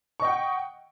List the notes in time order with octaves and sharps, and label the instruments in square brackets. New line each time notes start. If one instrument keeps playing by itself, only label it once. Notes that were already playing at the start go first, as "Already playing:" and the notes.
[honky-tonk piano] C#6
D#5
G5
F#5